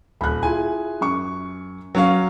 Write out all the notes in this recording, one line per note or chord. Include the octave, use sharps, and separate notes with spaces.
D#1 B5 F#6
E4 F4 G#4 G#5
F#2 C#6
F#3 C#4 F5